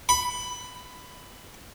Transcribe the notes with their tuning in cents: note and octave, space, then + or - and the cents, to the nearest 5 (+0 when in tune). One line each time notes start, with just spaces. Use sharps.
B5 +15